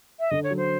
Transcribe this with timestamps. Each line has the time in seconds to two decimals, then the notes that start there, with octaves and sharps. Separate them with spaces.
0.20 E5
0.31 D3 D#5
0.44 C#5
0.51 F#3
0.57 C5